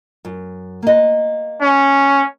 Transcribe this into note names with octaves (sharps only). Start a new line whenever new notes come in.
F#2
A#3 D#5
C#4